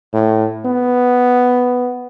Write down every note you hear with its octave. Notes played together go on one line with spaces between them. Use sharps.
A2
B3